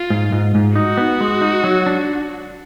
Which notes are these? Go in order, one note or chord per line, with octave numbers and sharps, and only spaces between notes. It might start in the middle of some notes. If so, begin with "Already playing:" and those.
Already playing: F4
G#2
G#2
G#2
D#4 F#4
B3
G#3
D#4
F#3
D4